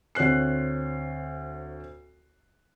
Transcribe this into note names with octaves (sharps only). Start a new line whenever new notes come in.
D2 C4 C#5 F#6 C7